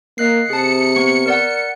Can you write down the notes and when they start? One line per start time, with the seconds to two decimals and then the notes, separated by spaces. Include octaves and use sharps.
0.18 A#3 D#5 F#6 C7
0.50 C3 G#4 A5 C#7
0.96 B3 C#6
1.26 A#4 D5 F#5